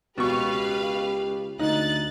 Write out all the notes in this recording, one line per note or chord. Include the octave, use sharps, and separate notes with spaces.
C#2 B2 G4 B4 F5 C#6
D2 D#4 F#6 A6